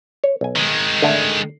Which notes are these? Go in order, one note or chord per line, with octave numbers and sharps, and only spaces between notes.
C#5
B1 G#5
D#3 G#3
D3 A3